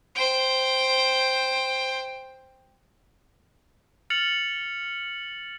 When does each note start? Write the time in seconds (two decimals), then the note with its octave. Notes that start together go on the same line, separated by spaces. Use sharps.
0.16 C5 G5
4.10 F6 A6 C#7 F7 F#7